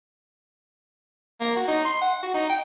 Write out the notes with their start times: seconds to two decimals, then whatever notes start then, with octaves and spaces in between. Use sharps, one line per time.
1.40 A#3
1.56 F#4
1.68 D#4
1.85 C6
2.01 F#5
2.23 F#4
2.34 D#4
2.50 G5